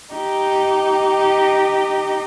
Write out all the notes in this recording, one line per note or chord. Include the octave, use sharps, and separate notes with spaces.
D#4 G4